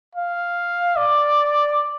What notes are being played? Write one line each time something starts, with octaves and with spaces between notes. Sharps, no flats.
F5
D5